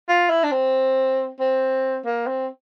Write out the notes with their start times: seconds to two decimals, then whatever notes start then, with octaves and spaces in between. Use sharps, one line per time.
0.09 F4
0.30 E4
0.44 D4
0.51 C4
1.40 C4
2.05 A#3
2.27 C4